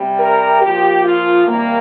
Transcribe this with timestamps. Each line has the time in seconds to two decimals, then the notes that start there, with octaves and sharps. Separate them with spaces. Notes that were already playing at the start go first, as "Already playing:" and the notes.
Already playing: C3 G3
0.19 A#4
0.62 A#2 F3 G4
1.05 F4
1.47 C3 D#3 G3 A#3